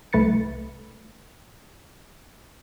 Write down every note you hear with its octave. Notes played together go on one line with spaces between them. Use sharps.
C2 A3 B4 A6 C#7